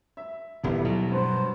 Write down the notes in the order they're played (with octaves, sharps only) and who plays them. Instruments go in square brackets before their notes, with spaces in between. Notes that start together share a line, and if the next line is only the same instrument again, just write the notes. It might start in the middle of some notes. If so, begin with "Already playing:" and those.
[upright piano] E5
[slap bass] D#1 D3 [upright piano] G3 B3 E4
[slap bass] B2 F#3
[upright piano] G2 [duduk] C5